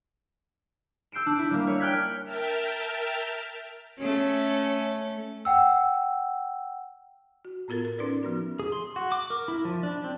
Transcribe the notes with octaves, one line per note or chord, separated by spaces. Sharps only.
E6 G6 C7 D7 E7
D4
E4
G3 A#3
C#5
G5 F6 F#6 G#6 B6
A#4 E5 G5 A5 F6
A3 C#4
F#5 G5 E6
F#4
A2 B3 F4 A4 A#4 A6
A#4
C#4 D#4 A4 B4 D5
F3 B3 F#4
G#4
C6
F#4
D6
A#4
E4
F3
D4
C4